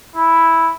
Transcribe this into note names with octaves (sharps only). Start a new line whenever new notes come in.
E4